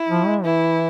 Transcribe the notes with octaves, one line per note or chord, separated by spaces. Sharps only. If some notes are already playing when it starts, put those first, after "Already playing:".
Already playing: E4
F3
G#3
E3 E4